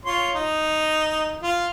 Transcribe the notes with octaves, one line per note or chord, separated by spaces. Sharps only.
F4 C#5 C6
D#4
F4